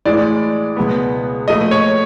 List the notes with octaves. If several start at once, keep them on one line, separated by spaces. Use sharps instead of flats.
A2 E3 G#3 D5
C#2 B2 G#3 B3
A#2 F3 A3 D#5
C#5